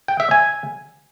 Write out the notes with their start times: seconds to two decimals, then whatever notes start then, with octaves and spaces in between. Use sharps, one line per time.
0.08 G5
0.20 E5
0.31 G#5